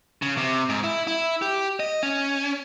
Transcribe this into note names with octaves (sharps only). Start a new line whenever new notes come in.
C#3
C3
G#2
E4
E4
G4
D#5
C#4